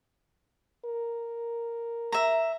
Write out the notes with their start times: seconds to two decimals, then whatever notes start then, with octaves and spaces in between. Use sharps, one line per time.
0.85 A#4
2.12 E5 A#5